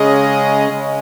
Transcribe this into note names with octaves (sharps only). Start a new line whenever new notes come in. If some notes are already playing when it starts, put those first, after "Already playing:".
Already playing: C#3 G#3 C#4 G#4 D#5
C#3 G#3 C#4